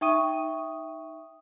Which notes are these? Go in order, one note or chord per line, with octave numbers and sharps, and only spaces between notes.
D#4 E5 G5 C#6 D#6 D#7